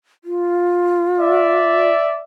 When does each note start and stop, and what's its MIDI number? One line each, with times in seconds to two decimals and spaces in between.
0.24 1.90 65
1.20 2.23 74
1.20 2.23 76